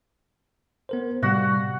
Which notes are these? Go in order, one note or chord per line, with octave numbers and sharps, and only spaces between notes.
B3 A#4 C5
A2 C3 G3 F#4 F#5